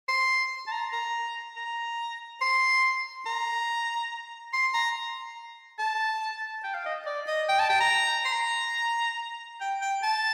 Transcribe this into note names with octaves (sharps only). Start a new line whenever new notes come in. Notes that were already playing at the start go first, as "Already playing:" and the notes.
C6
A5
A#5
A#5
A#5
C6
A#5
C6
A#5
A5
G5
F5
D#5
D5
D#5
G5
A5
G5
A#5
C6
A#5
G5
G5
A5